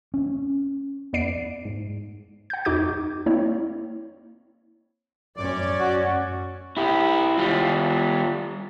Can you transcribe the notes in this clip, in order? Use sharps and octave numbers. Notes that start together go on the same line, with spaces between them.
C#4
F2 B3 D5 C7 D7
G#2
F#5 G6
F2 D#4 F#4 D6 G6
A#3 C4 E4 C#5
F#2 C#4 D5
F#4
E4 G4
G3 F4